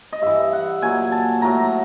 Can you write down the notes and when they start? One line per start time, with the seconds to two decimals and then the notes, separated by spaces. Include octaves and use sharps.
0.13 D#5
0.22 G2 E3 E5
0.53 F#5
0.82 A#2 F#3 G#5
1.12 A5
1.42 A2 F#3 A#5